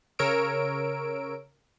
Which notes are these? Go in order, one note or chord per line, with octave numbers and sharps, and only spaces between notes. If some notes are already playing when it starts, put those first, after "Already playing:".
C#3 A#4 C#5 E6 D7